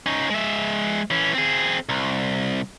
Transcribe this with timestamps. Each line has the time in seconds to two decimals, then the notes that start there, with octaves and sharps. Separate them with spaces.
0.06 C#4 D#4
0.30 G#3 E5
1.11 E3 C#4
1.34 C4 G#4
1.89 C2